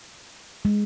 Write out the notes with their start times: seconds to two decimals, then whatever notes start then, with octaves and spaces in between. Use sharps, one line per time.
0.65 G#3